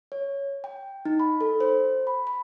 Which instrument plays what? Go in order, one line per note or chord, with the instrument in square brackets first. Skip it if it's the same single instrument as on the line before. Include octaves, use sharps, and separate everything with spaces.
[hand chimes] C#5
G5
D#4
B5
A4
C5
B5
B5